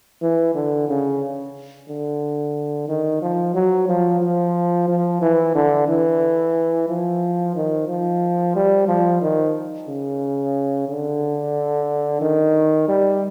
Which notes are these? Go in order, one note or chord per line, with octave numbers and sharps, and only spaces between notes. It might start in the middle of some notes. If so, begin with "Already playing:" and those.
E3
D3
C#3
D3
D#3
F3
F#3
F3
F3
F3
E3
D3
E3
F3
D#3
F3
G3
F3
D#3
C#3
D3
D#3
G3